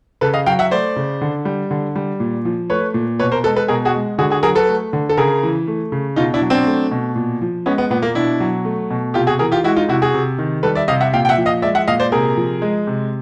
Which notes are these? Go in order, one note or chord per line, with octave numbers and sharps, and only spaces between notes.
C#3 A4 B4
D#5 F5
F#3 F5 G5
E5 F#5
A3 C5 D5
C#3
D3
G3
D3
G3
A#2
F3
A3 B4 C#5
A#2
B2 B4 C#5
A#4 C5
G#3 A4 B4
A4 B4
B2 G#4 A#4
F#4 G#4
G#3
D3 F#4 G#4
F#4 G#4
F#3 G#4 A#4
A4 B4
A3
D3
A4
C#3 G#4 A#4
E3
A3
C#3
B2 D#4 F4
D4 E4
F#3
C4 D4
A3
B2
A#2
F3
G#3 B3 C#4
B3
A#2 B3
A#3
B2 D4 E4
F#3
A3
B2
C3 F4 G4
F#4 G#4
E3 G#4 A#4
F4 G4
G#3 E4 F#4
D#4 F4
C3 E4 F#4
F#4 G#4
C3
D#3
G3 A4 B4
D5 E5
C3 D#5 F5
E5 F#5
A#2 F5 G5
G5
E5 F#5
F3
D#5 F5
G#3 D5 E5
E5 F#5
A#2 D#5 F5
C5 D5
C3 G#4 A#4
F3
G#3
C3